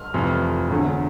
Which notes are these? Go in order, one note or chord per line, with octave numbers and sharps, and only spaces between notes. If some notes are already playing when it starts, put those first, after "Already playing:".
Already playing: F6
F1 F2 E3
E1 E2 D3